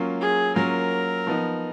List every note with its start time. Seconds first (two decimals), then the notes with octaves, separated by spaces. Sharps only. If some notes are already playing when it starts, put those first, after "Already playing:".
Already playing: F#3 A#3 C#4 F4
0.20 G#4
0.56 F#3 A#3 C#4 F4 A#4
1.27 F3 B3 D#4